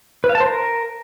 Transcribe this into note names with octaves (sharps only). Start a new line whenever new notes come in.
B4
F5
A5
C5
A#4